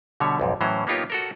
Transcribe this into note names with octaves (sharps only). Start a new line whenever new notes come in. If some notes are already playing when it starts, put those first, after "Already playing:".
B2 D3 G3 C#5 E5
B1 F2 G#2
A2 E3 F#3 C#4 C5 A#5
A#3 B3 D#4 F4 G4 C#5
F#4 A4 A#4